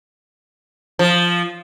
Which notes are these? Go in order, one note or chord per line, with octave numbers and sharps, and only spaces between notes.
F3